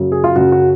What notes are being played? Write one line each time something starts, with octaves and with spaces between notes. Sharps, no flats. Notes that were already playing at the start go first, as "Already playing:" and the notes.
Already playing: F#2 C#3 F#3
G#4
F4
F#2 C#3 F#3 F#4
F#4